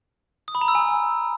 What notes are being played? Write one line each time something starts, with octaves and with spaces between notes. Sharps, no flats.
D#6
B5
A#5
E6
G#5